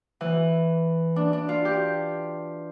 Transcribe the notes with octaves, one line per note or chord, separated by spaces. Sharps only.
E3
D4
D4
F4
G4